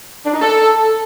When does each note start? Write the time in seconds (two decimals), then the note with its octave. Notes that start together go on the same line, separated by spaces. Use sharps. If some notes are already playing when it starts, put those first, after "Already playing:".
0.25 D4
0.33 D#4
0.42 A4